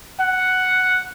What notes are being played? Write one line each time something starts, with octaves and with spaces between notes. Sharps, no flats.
F#5